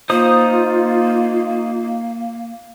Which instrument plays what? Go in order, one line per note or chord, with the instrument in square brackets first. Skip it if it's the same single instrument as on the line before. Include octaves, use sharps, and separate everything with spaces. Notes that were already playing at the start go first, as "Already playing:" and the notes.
[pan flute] A#3 [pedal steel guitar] D#4 C5 D#6 [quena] F4